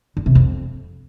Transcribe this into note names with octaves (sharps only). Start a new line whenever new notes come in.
D3
C3
F2